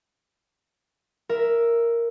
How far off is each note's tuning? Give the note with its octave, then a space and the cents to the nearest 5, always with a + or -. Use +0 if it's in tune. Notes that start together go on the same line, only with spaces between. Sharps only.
A#4 +0 E5 +5